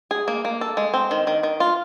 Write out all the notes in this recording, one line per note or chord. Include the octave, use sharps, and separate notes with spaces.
G#4
A#3
A#3
A4
G#3
C4
D#3
D#3
D#3
F4